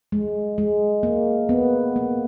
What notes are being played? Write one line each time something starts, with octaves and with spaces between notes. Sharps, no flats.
G#3
G#3
A#3
B3
A#3